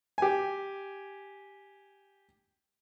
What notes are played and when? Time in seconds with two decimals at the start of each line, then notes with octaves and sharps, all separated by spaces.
0.18 G4 G#5